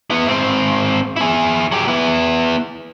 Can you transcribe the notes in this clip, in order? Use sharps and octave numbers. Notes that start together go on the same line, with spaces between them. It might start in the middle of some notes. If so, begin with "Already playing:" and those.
B3 E4
G#2 C4
E4 G#4
F#3 G4
B3 E4